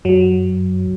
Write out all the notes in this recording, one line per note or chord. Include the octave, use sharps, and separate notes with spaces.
F#2 F#3